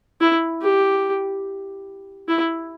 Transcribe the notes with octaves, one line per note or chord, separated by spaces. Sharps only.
E4
G4
E4